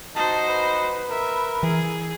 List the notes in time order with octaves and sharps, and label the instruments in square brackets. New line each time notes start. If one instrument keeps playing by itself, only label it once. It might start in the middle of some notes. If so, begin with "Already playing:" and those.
[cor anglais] D#4 [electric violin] F#4 C5 [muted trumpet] A5
[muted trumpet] B4
[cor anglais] A#4 [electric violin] E5
[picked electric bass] E3 [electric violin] G#4